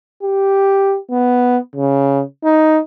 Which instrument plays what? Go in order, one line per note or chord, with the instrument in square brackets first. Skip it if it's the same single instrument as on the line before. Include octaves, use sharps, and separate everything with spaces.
[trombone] G4
B3
C#3
D#4